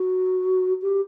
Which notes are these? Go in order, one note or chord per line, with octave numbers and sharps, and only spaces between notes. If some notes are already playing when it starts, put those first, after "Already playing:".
Already playing: F#4
G4